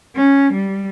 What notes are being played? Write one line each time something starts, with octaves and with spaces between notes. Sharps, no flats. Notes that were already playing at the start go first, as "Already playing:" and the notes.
C#4
G3